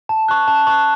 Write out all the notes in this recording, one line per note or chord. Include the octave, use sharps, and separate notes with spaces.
A5
C#6 F#6
A5
C#6 F#6